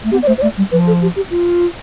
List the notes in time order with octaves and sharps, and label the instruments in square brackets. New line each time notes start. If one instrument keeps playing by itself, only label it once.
[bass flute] A3
[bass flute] B3 [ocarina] G4
[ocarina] D5
[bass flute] A3 [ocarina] C5
[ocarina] C5
[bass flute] A3 [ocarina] D5
[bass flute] G3
[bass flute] F3 [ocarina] B4
[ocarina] A4
G4
G4
F4